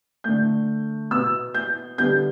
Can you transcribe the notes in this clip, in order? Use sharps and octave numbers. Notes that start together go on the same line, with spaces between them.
D3 A3 G6
B2 B3 E6
G6
D3 G3 B3 G6